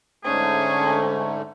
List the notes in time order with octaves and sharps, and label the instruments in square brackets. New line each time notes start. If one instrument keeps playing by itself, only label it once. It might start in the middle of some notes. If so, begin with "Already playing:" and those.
[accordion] G#2 D3 A3 [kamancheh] C#4 [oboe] G#4